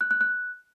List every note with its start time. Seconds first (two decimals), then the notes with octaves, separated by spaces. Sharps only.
0.01 F#6
0.11 F#6
0.21 F#6